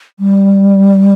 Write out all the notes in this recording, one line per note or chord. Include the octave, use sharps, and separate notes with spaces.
G3